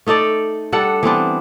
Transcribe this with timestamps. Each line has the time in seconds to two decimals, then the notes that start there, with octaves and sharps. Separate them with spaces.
0.07 A3 D#4 A4 D5
0.72 G3 D4 A4 F#5
1.03 E3 B3 C4 D4